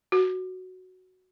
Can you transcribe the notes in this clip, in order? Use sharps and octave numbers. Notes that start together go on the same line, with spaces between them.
F#4